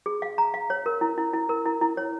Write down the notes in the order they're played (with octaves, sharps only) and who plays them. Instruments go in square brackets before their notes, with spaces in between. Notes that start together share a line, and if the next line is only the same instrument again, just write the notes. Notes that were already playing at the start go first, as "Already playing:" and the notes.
[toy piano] G#4
F5
A#5
F5
C#5
A#4
E4
E4
E4
A#4
E4
E4
C#5